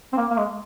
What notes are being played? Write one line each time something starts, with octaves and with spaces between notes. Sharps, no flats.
C4
A#3
A#3
G#3